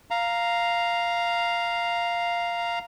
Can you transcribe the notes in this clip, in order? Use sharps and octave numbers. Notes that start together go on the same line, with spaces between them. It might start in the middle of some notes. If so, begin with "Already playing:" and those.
F5 A#5